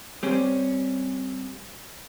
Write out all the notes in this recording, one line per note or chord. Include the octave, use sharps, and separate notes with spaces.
G3 C4 C#4